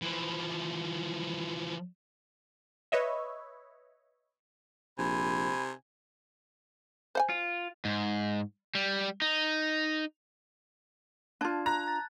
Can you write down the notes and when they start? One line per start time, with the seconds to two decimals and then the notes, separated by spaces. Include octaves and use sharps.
0.02 E3 F3
2.92 B4 C#5 D#5 E5
4.99 A#1 C3 G#5 B5
7.15 C5 F#5 G#5
7.30 F4
7.85 G#2
8.75 G3
9.22 D#4
11.41 D4 F4 A5 G#6
11.66 A#5 F#6
11.88 A6